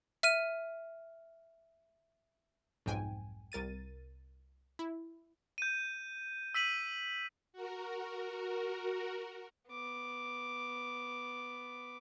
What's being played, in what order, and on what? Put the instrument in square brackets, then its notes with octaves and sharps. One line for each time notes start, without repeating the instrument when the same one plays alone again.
[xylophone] E5 F6 D#7
[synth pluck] B1 F2 G#2 G5 G#5
C2 A#4 A6 D#7
E4
[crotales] G6 D#7
E6 B6 D#7 F#7
[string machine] F#4 A#4
[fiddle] B3 D6